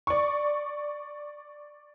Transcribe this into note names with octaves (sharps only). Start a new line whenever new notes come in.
D5 C#6